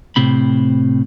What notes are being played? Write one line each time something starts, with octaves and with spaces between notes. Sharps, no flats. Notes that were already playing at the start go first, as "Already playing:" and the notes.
A2 C3 C4 B5